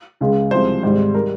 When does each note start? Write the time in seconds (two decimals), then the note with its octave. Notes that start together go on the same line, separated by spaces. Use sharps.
0.21 C#2 C#3 G#3
0.51 C2 C3 F3 G#3 C5
0.83 G#1 G#2 G3 C5
1.14 A#4
1.18 G3